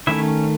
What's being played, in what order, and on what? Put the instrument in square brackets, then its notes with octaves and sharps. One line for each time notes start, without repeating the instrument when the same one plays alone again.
[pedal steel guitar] D#3 A3 C#4 E4 E5